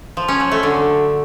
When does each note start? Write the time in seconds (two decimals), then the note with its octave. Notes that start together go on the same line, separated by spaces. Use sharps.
0.17 F3
0.28 C#4
0.40 F#3
0.52 A3
0.63 D3